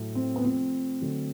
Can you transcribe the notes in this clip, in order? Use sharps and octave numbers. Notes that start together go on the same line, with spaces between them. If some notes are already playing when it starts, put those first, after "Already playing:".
Already playing: A2 F#3 A3
C4
B3
C3 F3 A3 C4
D3 F#3 A3